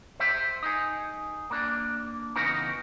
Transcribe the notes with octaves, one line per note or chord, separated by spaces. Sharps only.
C5 E5
D#4 G#4
A#3 D4
C#3 E3 B3 D#4 F#4 A#4